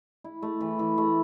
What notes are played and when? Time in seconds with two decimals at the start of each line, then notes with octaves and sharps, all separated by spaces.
0.24 E4
0.42 A3
0.61 E3
0.79 E3
0.98 A3